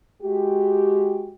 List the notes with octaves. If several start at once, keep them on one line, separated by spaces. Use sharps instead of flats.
G#3 F#4 G4